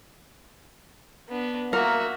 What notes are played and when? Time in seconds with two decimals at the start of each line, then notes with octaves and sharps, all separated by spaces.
1.29 B3 D4
1.73 A#3 F#4 A#4 E5